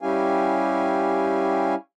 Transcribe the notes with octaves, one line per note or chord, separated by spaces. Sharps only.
G3 C#4 E4 G4 F5 G#5